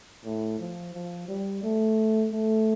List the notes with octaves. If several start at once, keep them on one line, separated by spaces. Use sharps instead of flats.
A2
F3
F3
G3
A3
A3